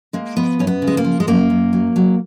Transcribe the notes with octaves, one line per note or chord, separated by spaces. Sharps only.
G#3 A#3
F3 B3
F#2 C#4
B3
C#3
G#3
A#3
F3
G#3
F#2 A#3
F#2
F#3
F#3